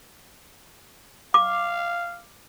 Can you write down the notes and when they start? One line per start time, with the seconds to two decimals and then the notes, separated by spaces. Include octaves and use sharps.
1.34 F5 D6